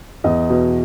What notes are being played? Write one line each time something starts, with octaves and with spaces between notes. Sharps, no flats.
E2 D#5
B2